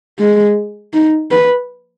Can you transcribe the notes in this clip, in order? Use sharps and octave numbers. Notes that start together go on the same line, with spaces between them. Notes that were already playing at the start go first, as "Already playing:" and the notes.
G#3
D#4
B4